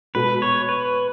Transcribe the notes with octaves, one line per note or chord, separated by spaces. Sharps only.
B2 G#3 B3 F#4 A4 B4
C#5
B4